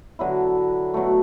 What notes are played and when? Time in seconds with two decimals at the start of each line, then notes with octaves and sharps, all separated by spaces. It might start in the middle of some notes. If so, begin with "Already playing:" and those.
0.19 D3 F#3 B3 E4
0.94 B2 F#3 A3